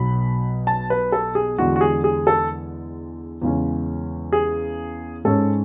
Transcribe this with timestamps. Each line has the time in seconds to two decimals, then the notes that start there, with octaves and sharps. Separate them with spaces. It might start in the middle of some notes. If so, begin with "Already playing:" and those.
Already playing: B1 B2 F#3 B5
0.67 A5
0.90 B4
1.12 A4
1.35 G#4
1.58 E2 D3 G#3 F#4
1.76 F#4
1.81 G#4
2.04 G#4
2.27 A4
3.41 E2 C#3 G#3 C#4
4.33 G#4
5.25 G#2 G#3 C#4 A4